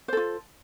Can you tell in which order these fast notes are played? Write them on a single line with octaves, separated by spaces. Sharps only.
C5 A4 F4